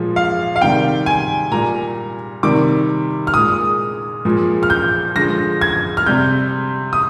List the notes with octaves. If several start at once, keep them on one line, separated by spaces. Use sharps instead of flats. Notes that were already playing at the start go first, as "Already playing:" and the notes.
Already playing: A#2 F3 G#3
F5
F5
C3 D#3 G3 G5
G#5
A#2 G3 A#5
C3 D#3 G3 D6
F6
A#2 G#3 D#6
A#2 F3 G#3
F6
G6
D3 F3 G#3 A#6
G#6
F6
C3 G3 G6
D#6